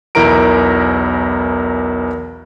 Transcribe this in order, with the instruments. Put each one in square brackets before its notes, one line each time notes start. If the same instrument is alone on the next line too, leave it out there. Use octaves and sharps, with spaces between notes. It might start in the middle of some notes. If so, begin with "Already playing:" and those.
[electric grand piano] B1 E2 E4 A#4 A#5 D7